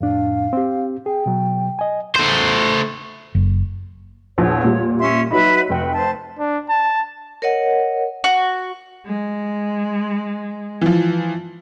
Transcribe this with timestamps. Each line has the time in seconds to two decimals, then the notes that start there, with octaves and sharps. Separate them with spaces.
0.01 F2 A2 D4 F5
0.53 C4 G4
1.06 G#4 G5
1.26 B2 F#3
1.79 D#5 G#5
2.16 A3 C5
3.35 F#1
4.38 A#1 E2 F3 C#5
4.64 A#2 G3
4.99 C#4 E5 C6
5.31 F#3 D#4 B4 E5 B5
5.70 F1 F#4 G5
5.94 C5 A5
6.39 D4
6.69 A5
7.42 A#4 C#5 D#5 F#5
8.24 F#4
9.07 G#3
10.81 E3 F3